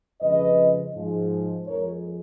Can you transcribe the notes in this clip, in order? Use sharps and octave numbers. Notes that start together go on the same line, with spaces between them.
F2 C#3 G#3 B4 D#5
G#2 F3 G#3
F2 F3 G#3 A#4 C#5